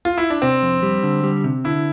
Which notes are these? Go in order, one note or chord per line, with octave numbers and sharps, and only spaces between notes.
F4
E4
D4
C3 C4
F2
G3
D3
G3
C3
D3 E4